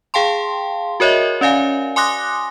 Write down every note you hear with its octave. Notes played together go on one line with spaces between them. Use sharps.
G#4 F5 G5 A5 C6
F#4 A#4 C#5 D#5 E5
C#4 D5 F5 G#5
G#5 C6 D6 D#6 F#6 A#6